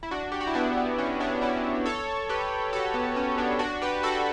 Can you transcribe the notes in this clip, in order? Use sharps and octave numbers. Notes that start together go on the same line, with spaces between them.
E4
D4 F#4
G4
F#4
E4
B3 D4
B3
C#4
B3 D4
C#4 E4
A4 C#5
G4 B4
F#4 A4
B3
C#4
B3 D4
D4 F#4
G4 B4
F#4 A4